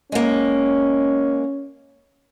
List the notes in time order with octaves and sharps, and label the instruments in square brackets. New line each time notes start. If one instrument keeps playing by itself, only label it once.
[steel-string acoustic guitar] G#3 A#3 [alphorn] C#4